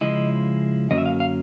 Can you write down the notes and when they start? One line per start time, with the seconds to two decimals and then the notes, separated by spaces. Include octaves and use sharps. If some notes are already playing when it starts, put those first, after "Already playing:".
0.01 C#3 F3 G#3 E4 D#5
0.91 F#2 D3 F#3 A#3 C#4 D#5
0.98 E5
1.06 F5
1.20 F5